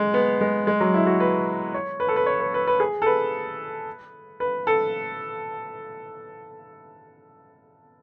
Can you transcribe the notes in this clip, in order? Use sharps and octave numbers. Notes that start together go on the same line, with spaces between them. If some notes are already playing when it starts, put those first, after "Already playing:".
Already playing: G#3
B3
G#3
G#3
F#3
E4
F#4
B4
C#5
B4
A4
B4
C#5
B4
B4
B4
G#4
A4
B4
B4
A4